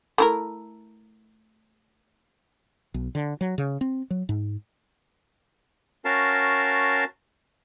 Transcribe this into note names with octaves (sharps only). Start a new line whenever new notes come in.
A3 E4 A#4
B1
D3
F#3
C#3
C4
F#3
G#2
C#4 F#4 A#4 F5 A5